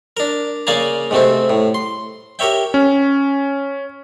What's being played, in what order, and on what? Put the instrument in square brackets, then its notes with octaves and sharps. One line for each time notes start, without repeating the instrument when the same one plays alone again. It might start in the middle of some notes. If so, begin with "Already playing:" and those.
[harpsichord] D4 A#4
C#3 A#3 D5 F5 G#5 A#5
G#2 C3 A3 C4
A2
C6
G4 A#4 C#5 E5 G5
[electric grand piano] C#4